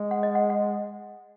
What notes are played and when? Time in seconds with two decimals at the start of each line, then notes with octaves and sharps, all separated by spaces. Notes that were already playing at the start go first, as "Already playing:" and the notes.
Already playing: G#3
0.11 F#5
0.23 D#5
0.35 F#5
0.50 F#5